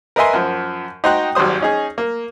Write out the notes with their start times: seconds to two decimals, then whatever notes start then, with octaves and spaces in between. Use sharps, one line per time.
0.16 A#4 B4 D#5 E5 G#5 C6
0.33 F#2 F3
1.04 D#4 F#4 C5 G5 A#5 F#6
1.35 G#1 F#3 G3 C5 D#6
1.61 C#4 D#4 G#4
1.98 A#3